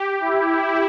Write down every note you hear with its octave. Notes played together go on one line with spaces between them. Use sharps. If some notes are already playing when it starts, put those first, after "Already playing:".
Already playing: G4
E4